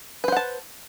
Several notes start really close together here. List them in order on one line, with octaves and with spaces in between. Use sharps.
B4 C5 F#5 A5